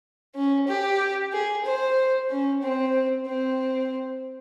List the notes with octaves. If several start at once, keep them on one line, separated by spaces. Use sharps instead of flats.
C#4
G4
G#4
C5
C#4
C4
C4